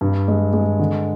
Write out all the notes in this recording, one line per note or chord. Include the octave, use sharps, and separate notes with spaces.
G2
G#3
G#3
D3